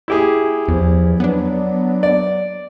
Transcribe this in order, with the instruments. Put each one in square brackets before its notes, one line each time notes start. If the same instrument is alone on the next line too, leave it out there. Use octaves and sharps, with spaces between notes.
[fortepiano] E4 G4 G#4
[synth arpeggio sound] E2 [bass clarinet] F3
[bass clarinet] F#3 [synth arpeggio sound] B3 D4
[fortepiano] D5